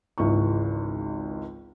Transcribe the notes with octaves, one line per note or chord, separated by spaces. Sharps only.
G#1 C#2 E3 C#6